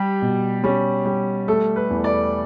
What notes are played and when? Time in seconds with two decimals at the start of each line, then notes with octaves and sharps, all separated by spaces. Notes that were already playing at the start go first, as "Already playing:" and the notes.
Already playing: G3 G4
0.22 B2
0.64 G3 C#4
1.06 G3
1.48 A3 A4
1.76 B4
1.90 E2
2.04 D5